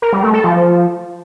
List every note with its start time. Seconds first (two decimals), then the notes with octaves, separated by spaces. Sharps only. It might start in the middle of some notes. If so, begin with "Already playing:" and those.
0.02 A#4
0.13 G3
0.23 A3
0.34 A4
0.44 F3